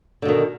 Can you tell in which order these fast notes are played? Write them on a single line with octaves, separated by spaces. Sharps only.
D3 B2 D#3